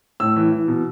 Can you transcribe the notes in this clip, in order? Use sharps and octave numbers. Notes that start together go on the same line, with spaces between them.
A2 E6
E3
E3
B2